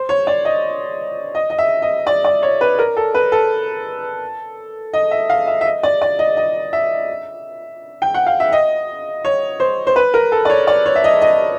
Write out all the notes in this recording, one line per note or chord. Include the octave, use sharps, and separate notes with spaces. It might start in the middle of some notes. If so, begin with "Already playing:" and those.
Already playing: C5
C#5
D5
D#5
D#5
D#5
E5
D#5
D5
D5
C#5
B4
A#4
A4
B4
A4
D#5
E5
F5
E5
E5
D#5
D5
D5
D#5
D#5
E5
G5
F#5
F5
E5
D#5
C#5
C5
C5
B4
A#4
A4
D5
C#5
D5
C#5
E5
D#5
D#5